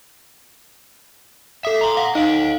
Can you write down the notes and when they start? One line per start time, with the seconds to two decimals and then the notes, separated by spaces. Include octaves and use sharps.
1.65 A4 E5 D#6
1.81 A#5 C6
1.97 F5 F#5
2.15 D#4 D#5 F5 D7 F#7